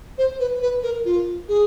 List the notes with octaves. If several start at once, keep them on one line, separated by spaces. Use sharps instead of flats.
C5
B4
B4
A#4
F4
G#4